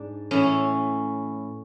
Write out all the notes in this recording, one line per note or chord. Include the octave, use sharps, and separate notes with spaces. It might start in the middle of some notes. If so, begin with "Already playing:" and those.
Already playing: G#2 D4
A2 E3 C#4